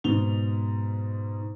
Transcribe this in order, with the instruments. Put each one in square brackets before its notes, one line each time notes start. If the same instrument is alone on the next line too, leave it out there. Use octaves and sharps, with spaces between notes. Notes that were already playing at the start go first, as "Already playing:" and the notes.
[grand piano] G#2 B2 F7 G7